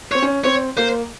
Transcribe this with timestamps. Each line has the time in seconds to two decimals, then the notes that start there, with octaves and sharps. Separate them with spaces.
0.12 C4 C#5
0.22 C#4
0.44 C4 C#5
0.77 A#3 C5